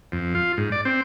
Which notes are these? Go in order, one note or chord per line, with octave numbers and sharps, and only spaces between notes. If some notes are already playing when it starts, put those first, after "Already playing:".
F2
F4
G#2
D5
C4